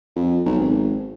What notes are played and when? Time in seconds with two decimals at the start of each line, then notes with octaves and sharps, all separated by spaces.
0.16 F2
0.46 B1
0.59 G#1